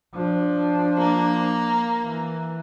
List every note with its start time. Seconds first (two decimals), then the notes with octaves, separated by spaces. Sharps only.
0.15 F3 D4
0.98 A#3
2.05 E3